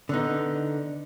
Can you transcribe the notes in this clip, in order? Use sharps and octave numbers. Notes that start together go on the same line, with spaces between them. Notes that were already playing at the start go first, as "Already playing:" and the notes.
D3 B3 D#4